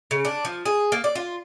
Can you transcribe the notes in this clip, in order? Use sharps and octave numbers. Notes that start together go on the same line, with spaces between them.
C#3
D4
F3
G#4
A#3
D5
F4